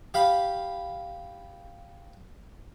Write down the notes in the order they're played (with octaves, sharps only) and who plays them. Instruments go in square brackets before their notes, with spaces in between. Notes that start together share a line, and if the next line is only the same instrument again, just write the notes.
[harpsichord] G4 F5 B5